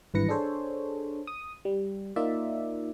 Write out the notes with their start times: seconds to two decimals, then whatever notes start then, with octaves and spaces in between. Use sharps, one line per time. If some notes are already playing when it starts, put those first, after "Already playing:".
0.14 G#1 G2 E3 B4 A#6 C#7
0.29 D4 G#4 A4 C5 C#5
1.27 D#6
1.65 G3
2.16 A#3 D#4 F4 D5 E5